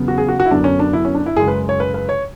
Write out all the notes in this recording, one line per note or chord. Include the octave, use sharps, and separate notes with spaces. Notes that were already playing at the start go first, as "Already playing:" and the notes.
Already playing: E2 C#3 F#3 B3
F#4
G#4
F#4
F#4
E4
F#2 D3 F#3 B3 D4
C#4
D4
E4
C#4
D4
E4
F#2 C#3 G#3 G#4
B4
C#5
B4
B4
C#5